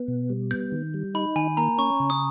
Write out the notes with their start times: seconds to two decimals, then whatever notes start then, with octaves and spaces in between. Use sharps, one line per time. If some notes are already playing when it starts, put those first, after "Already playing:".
Already playing: B3
0.08 B2
0.30 G3
0.51 B3 G6
0.72 D#3
0.94 G3
1.14 D#4 B5
1.36 D#3 G#5
1.57 A#3 A#5
1.78 C#4 C#6
2.00 C#3
2.10 D#6